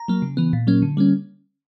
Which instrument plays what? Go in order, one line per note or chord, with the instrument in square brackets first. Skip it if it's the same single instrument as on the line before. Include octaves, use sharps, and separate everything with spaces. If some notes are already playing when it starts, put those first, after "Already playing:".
Already playing: [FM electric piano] A#5
F#3 A#3
C#3
E3 B3
A#2
F#3 A#3 C#4
D3
G3 A#3 C#4